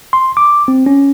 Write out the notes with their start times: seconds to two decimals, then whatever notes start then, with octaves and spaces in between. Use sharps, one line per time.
0.13 C6
0.37 D6
0.68 C4
0.86 C#4